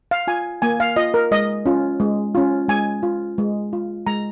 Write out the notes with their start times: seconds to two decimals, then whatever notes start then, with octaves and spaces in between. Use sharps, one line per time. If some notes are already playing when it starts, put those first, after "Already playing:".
0.11 F5
0.27 F4 G#5
0.62 A#3 G#5
0.80 F5
0.96 F4 D#5
1.14 A#4
1.31 G#3 D#5
1.66 C#4 F4
2.00 G#3
2.35 C#4 F4
2.68 G#3 G#5
3.03 F4
3.38 G#3
3.73 F4
4.07 G#3 A#5